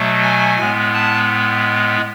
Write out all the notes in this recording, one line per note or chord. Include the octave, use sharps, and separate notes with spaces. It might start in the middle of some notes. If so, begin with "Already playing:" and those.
Already playing: B2 F#3 A3
G#5
A2 G#3 B3
A5